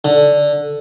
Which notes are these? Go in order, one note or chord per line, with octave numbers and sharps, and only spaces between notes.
D3